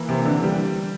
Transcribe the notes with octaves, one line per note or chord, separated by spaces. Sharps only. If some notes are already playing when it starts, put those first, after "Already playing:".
Already playing: E3 A#3
C3
D3
G3